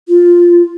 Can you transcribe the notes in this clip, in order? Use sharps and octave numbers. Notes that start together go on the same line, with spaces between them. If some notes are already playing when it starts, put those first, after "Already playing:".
F4